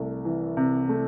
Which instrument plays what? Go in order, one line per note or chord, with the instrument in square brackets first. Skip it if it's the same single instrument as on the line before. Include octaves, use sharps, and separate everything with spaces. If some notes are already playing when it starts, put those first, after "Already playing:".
Already playing: [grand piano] C2 A3
E3
C3
A3